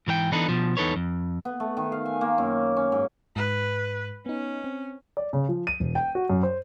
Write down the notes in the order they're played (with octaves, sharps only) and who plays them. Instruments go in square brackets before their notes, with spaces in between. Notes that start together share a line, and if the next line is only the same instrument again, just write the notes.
[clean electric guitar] G#2 E3 A#4 G5
E3 B3 D4 D#4 A4 B4
B2 F3
E2 D#4 A4 B4 C#5
F2
[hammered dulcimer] B3
A3
D#3
F5
G#5
A#3
F#2
C#4
G#2
[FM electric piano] G#2 [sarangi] B4
[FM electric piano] B3 D#4 [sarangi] C#4
[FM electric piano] C4
[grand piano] D5
C#3
F3
D#7
E1
G5
F#4
F#2
C5